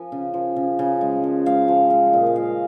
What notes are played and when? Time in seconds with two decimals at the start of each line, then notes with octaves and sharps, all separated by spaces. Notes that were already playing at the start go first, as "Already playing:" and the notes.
Already playing: F3 G#5
0.12 C#3
0.34 F3
0.56 C#3
0.79 C#3
1.01 G#3
1.24 F3
1.46 G#3 F5
1.68 F3 G#5
1.90 G#3 F5
2.13 A#2 D#5
2.26 G#5
2.36 G#3 F5